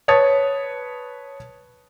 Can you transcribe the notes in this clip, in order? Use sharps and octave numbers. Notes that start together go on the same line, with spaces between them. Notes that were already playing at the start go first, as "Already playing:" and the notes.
B4 C#5 A5 D#6 A6